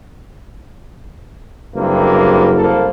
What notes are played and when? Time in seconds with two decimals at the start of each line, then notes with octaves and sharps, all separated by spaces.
1.75 F#1 G2 C3 A#3
2.58 C2 A#3 A4